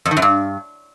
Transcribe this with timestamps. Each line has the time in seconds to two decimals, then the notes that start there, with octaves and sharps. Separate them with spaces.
0.05 F2
0.11 D#3
0.17 F#2
0.22 G2